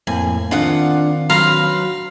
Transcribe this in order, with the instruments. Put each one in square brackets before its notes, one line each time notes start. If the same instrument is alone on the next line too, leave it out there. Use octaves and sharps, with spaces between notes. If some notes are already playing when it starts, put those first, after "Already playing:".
[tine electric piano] F2 A2 A#3 [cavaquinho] G#5
[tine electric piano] D#3 C4 [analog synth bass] D4 [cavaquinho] F4 F#5
[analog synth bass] F#3 [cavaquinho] B4 C6 [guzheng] F5 A#5